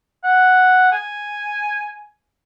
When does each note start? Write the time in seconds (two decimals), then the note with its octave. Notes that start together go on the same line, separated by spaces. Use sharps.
0.24 F#5
0.92 G#5